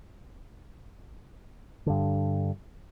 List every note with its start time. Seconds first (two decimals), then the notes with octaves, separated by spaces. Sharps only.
1.86 G2 D3